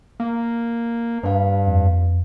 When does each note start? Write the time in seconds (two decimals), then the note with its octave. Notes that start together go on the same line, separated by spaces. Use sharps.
0.20 A#3
1.23 G2 B4 F5
1.67 F2